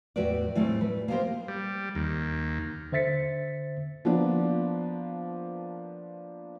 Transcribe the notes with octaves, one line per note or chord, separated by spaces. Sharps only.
E2 A2 F#4 G4 B4 D5
A2 E3 G3 A3 C4
B4
A#3 B3 G4 G#4 A#4 C5
G3
D#2
D3 C5 E5 A6 B6 C#7
F3 A#3 B3 D4